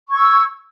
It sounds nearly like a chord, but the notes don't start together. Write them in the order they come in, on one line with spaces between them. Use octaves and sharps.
C#6 G#6 E6